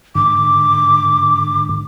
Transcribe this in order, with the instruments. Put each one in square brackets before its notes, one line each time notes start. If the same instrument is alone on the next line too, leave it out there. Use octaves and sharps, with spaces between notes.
[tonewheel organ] G#2 D3 [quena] D6